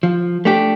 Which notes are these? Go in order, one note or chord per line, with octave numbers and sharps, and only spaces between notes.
F3
A3 D4 G4